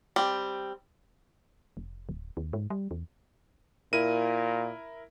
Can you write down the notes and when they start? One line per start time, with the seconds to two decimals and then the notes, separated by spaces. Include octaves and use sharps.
0.16 G3 C4
1.77 F1
2.09 D1
2.37 D#2
2.53 G#2
2.70 G3
2.91 E2
3.93 A#2 E4 A#4 D#7